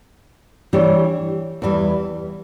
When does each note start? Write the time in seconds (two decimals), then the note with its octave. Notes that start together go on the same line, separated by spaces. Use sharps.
0.73 E3 G3 D4 G4 C#5
1.62 E2 E3 G3